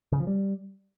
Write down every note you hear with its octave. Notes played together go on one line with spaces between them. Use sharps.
C#3
F3
G3